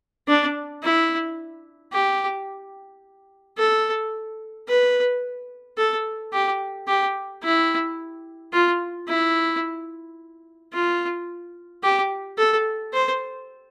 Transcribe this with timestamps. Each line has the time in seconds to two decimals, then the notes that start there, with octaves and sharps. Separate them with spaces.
0.28 D4
0.83 E4
1.93 G4
3.58 A4
4.68 B4
5.78 A4
6.33 G4
6.87 G4
7.43 E4
8.53 F4
9.08 E4
10.73 F4
11.83 G4
12.38 A4
12.93 C5